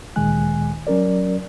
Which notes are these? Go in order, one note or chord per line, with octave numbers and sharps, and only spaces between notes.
D2 A#2 D#3 G#3 G#5 F#6
F#3 C#4 A#4 D5